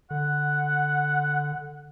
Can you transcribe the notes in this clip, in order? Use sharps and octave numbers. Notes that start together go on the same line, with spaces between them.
D3 F#5